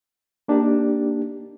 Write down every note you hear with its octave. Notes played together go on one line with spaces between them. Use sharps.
A#3 D4 D#4 G4